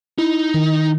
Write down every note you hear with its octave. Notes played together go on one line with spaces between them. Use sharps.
D#4 E4
D#3